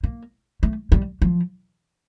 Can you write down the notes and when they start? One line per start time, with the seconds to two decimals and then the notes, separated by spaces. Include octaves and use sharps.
0.04 A#3
0.63 A3
0.92 G3
1.22 F3